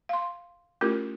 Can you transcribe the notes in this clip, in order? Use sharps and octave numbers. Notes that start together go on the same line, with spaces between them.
F5 C6
A3 C#4 E4 F4 G4 A#4